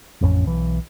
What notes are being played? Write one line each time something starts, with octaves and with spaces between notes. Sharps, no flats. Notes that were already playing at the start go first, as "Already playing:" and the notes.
A1 F2 B3 C#4
B1 E3